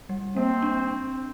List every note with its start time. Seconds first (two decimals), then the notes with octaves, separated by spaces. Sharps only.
0.09 G3
0.36 A#3 C4
0.62 D4